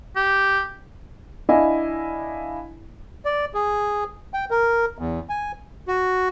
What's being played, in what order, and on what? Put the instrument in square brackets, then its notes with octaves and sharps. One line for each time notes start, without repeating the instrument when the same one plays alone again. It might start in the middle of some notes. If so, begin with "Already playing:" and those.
[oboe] G4
[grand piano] D4 E4 D#5 F5 G#5
[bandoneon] D5
G#4
G5
A#4
E2
G#5
[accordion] F#4